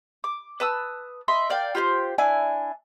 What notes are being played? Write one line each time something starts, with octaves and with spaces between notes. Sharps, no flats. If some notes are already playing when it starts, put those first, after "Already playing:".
D6
B4 A5 D#6 E6
D#5 E5 B5 C6
A#4 D5 F5 G5
F4 G4 B4 C5
D4 E4 G#5